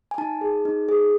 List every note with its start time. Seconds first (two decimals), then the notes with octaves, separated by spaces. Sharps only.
0.11 G#5
0.18 D#4 A5
0.41 G#4
0.65 D#4
0.89 G#4